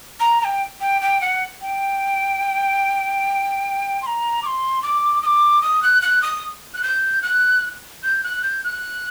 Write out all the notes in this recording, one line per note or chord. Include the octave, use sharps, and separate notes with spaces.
A#5
A#5
G5
G5
G5
F#5
G5
C6
A#5
D6
C6
D6
D#6
D6
D#6
F#6
F#6
D#6
F#6
G6
F#6
G6
F#6
G6
F#6